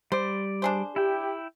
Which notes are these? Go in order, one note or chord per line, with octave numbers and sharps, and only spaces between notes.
G3 C5 D5
D4 G#4 C5
E4 G4 G5